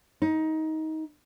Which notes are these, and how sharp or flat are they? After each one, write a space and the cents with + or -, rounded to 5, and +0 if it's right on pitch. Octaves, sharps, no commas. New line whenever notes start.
D#4 +20